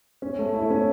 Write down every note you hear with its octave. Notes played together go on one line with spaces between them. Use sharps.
C#4
A3
E4
C#4